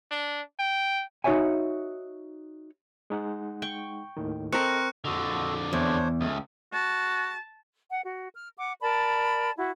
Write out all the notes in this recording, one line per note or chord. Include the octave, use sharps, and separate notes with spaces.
D4
G5
D#4 F#4 C5 C#5 E5 G#5
G#3 D#4 F#5
G5 C#6
D#2 A2 D#3
C4 A4 A#4 C5 D#5 C#6 F#6 C#7
F2 D3 F#4 A4 D#5
E2 D4 C5 C#5
C#2 A3 D#6
F#4 A5
F#5
F#4
F6
F#5 D6
A#4 D5 A5 B5
E4 F#4